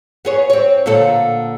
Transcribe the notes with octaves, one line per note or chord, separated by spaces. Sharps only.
B3 G#4 C#5
C4 C#5
A#2 D3 A4